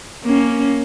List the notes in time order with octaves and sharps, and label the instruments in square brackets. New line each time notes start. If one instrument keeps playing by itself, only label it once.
[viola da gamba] A#3 C#4